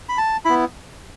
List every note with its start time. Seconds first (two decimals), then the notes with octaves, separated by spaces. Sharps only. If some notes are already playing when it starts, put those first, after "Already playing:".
0.09 B5
0.18 A5
0.45 B3 E4 B5